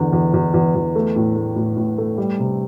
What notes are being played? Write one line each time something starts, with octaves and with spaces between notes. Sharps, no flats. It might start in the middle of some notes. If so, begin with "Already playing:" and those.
Already playing: E2 D3
E2
E2
E2
E2
A3
A2
A3
A2
A2
A3
G3
C3